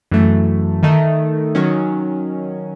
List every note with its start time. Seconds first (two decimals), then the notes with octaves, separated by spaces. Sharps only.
0.11 F#2 E3 A3
0.83 D#3 A3 D#4
1.55 D#3 F#3 C#4